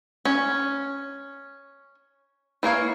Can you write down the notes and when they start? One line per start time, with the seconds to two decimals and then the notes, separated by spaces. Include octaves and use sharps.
0.25 C#4
2.63 E3 A#3 C#5 F5